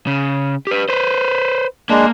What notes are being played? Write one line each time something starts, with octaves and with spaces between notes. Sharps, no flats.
C#3
G4 B4
B4 C5
G#3 A#3 D4